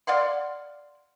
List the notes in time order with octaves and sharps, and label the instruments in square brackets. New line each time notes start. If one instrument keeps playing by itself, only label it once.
[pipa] D5 F5 F#5 C6